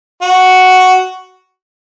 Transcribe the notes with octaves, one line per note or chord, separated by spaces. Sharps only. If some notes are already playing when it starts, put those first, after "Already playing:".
F#4